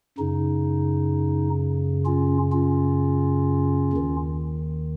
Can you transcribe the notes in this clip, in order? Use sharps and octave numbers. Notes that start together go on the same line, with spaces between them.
F#2 C#3 D#4
C#4 F4
C#4 F4
D#2 D#3